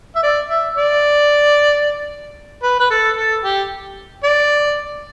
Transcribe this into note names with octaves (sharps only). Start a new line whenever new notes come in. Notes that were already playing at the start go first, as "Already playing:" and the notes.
E5
D5
E5
D5
B4
B4
A4
A4
G4
D5